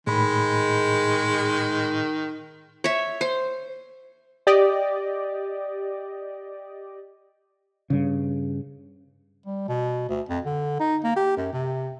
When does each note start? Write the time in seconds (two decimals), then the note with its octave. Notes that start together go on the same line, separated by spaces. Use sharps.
0.07 A2 D#3 G#3 B5
2.84 C#5 E5
3.21 C5
4.47 G4 D5 D#5
7.90 G2 C#3
9.46 G3
9.68 B2
10.09 D2
10.29 F2
10.45 D3
10.80 D#4
11.04 A#3
11.16 G4
11.37 F#2
11.53 C3